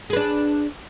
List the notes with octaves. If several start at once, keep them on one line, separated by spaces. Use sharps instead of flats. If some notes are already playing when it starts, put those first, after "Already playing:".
D4 G#4 B4